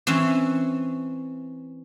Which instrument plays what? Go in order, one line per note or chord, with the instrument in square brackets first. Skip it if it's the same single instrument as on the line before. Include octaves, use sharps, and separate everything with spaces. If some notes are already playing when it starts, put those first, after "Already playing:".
[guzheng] E3 C4 C#4